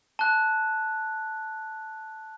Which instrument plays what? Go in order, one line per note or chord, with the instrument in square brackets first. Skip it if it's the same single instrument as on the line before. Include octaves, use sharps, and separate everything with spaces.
[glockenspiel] A5 F#6